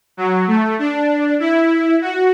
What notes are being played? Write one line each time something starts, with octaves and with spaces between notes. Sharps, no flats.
F#3
A3
D4
E4
F#4